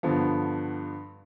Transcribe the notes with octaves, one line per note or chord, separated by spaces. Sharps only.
G2 D3 F3 B3